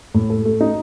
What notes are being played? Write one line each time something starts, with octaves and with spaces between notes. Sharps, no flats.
A2
A4
A3
D#4